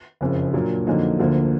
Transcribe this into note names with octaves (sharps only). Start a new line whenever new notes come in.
F#1 F2 C#3
A#2 F#3 A#3 D4
F2 D3 F#3 A#3 D#4
D2 D3 F3 A#3